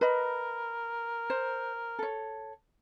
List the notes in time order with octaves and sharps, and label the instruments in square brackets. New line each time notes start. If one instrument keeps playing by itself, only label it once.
[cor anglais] A#4 [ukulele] B4 D#5 B5
[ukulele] C5
A4 C#5